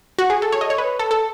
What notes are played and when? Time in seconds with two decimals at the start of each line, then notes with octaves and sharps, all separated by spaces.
0.19 F#4
0.30 G#4
0.42 A4
0.52 C#5
0.61 D#5
0.70 C#5
0.78 B4
0.99 A4
1.11 A4